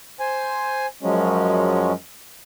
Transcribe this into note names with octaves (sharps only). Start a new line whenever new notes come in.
C5 G#5
F#2 F3 F#3 G#3 C#4